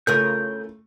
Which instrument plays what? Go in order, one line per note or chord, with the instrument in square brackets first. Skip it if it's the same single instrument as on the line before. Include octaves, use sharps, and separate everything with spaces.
[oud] C#3 F4 A#4 [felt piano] A3 [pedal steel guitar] G6